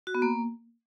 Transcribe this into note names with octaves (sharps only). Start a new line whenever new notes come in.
F#4
B3
A#3